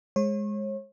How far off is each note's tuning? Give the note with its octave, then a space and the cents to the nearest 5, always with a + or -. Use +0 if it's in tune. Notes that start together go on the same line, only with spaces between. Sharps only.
G#3 +0 C#5 -35